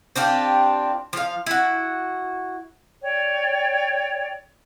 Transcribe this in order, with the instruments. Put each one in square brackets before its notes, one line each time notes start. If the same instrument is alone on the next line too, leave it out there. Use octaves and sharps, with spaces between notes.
[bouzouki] C4 D4 F4 G4
F3 F5
E4 F#4
[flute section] C#5 D5 G5